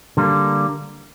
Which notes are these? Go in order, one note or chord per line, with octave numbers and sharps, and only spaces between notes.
D3 G3 A#3